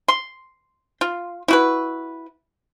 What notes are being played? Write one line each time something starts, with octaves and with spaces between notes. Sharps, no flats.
C6
F4
E4 F#4 B4